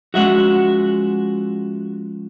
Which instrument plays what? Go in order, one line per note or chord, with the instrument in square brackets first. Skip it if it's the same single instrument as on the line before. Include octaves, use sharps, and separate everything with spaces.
[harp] F3 G#3 C#4 [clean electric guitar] F#4 E5 F#5